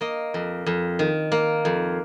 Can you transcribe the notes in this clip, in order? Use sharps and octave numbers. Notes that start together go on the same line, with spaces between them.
A#3 D#5
F2
F2
D#3
A#3
F2